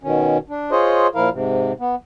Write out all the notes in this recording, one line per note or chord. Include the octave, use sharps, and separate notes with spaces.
B2 D#3 C#4
D4
F4 G#4 C5 C#5 D#5
A#2 F3 E4 A#4 F5
G#2 C3
B3